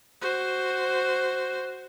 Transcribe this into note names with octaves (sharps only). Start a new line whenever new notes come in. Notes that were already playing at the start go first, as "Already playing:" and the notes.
F#4 C5